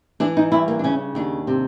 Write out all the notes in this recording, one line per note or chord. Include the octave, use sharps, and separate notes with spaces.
E3 D4
D#4
G2 E4
A#3
D4
C#3 C#4
D#2 D4
C3